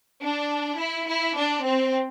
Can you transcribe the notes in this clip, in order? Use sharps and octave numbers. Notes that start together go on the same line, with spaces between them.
D4
E4
E4
D4
C4